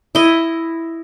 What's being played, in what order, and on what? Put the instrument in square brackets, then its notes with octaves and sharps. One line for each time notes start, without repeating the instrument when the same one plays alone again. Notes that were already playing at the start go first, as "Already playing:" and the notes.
[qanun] E4 D#5